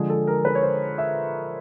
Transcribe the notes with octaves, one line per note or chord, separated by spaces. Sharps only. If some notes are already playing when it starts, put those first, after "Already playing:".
Already playing: D3 F3 G#3 G#4
A4
A#4
B4
C#5
C5
E5